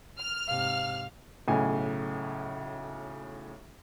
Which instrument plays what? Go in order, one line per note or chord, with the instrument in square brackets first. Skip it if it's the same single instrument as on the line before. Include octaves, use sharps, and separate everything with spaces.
[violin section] F6
[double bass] G#2 C3 [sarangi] F5
[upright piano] B1 A2 C#3 G#5